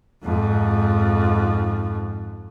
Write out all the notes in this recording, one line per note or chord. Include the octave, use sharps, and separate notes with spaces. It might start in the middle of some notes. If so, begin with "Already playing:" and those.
F2 G#2